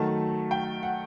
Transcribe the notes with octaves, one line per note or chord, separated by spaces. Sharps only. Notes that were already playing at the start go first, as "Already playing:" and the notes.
Already playing: D#3 F#3 A3 A5
G5
F#5